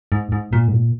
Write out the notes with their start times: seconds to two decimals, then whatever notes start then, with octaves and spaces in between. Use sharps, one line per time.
0.12 G#2
0.32 G#2
0.53 A#2
0.68 G#2
0.73 A#2